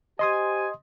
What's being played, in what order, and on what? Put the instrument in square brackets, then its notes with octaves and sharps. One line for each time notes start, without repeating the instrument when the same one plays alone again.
[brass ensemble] G4 C5 G#5 [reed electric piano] D#5 C6 D#6